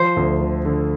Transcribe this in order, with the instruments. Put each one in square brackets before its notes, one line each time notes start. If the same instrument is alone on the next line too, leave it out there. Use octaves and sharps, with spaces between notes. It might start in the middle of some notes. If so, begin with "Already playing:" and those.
Already playing: [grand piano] F3 [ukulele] C5
[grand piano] D2
D3
D3